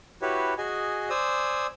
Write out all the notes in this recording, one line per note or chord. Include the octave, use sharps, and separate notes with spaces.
E4 F#4 G4 B4 C#5
F#4 G#4 D#5 G#5
C5 D5 G#5 D#6 E6